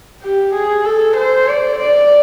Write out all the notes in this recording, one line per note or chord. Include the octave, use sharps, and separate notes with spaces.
G4
G#4
A4
C5
D5
D5